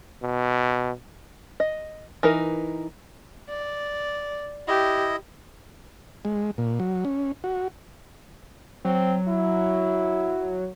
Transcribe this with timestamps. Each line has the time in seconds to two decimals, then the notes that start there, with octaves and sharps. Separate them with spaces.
0.22 B2
1.60 D#5
2.23 E3 D#4 A#4
3.49 D5
4.68 E4 G4 D#5
6.25 G#3
6.58 A#2
6.80 F#3
7.05 C#4
7.44 F#4
8.85 F#3 C4
9.29 E4